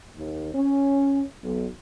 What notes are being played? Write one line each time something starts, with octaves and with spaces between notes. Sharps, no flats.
D#2
C#4
B1